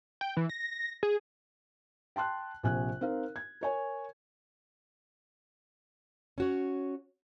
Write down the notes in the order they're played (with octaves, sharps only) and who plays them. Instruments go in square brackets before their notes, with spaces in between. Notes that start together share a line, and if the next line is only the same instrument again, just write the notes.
[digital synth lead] G5
E3
A#6
G#4
[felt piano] G5 A5 C6 F#6
A#1 C3 G#5 F#6
C4 D#4 A#4 F5
G#6
A#4 C#5 G#5
[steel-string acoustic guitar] C#4 F#4 C#5